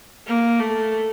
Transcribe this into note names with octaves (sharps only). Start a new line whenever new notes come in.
A#3
A3